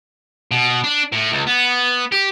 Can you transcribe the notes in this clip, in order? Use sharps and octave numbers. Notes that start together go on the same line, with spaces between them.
B2
D4
A2
C#2
B3
G4